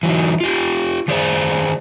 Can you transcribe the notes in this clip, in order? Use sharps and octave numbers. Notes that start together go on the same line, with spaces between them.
E3 F#3 D#4
F4 G4
D#3 G#4 C5 D5